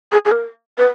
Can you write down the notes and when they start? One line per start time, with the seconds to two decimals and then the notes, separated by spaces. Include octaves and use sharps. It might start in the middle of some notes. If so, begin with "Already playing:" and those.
0.12 G#4
0.25 G#4
0.32 A#4
0.78 B4